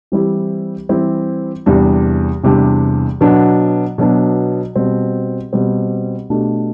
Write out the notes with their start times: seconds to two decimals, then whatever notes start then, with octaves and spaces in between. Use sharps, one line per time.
0.12 E3 G3 C4 E4 G4
0.89 E3 G3 C4 E4 G4
1.66 E2 C3 G3 D4
2.43 E2 C3 G3 D4
3.21 B2 F#3 B3 D4
3.98 B2 F#3 B3 D4
4.76 B2 G3 C4
5.53 B2 G3 C4
6.30 B2 A3 D4 G4